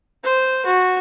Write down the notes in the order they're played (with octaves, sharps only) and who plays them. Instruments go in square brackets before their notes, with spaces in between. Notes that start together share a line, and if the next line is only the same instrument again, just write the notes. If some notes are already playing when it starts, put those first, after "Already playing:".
[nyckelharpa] C5
F#4